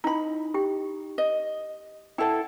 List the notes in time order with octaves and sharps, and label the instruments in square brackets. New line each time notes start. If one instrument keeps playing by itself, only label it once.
[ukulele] D#4 B5 [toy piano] E4
[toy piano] G4 G5
[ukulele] D#5
[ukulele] E4 A4 [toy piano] D5 F#5 G5